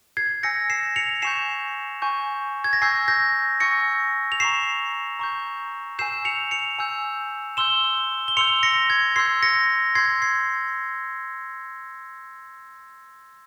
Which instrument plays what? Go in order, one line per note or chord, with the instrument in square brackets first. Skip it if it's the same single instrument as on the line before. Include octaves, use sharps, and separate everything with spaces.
[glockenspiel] G#6 C7
G#5 E6 G6 A#6 C#7
C7 E7
C#7 F7
G#5 C#6 G6 C7 E7
G#5 C#6 G6
G#6
A#6
G#5 C#6 E6 G6 G#6 C7
G6 A#6
G#5 C#6 E6 G6 A#6 C#7
F7
A#5 C#6 G6 C7 E7
A#5 C#6 G6
G#5 E6 G6 C7 E7
C#7 F7
C#7 F7
G#5 E6 G6
C6 E6 G6 E7 G7
G7
C6 E6 G6 C#7 F7
A#6 C#7
G#6
C6 E6 G6 G#6 C7
A#6 C#7
C6 E6 G6 G#6 C7
G#6 C7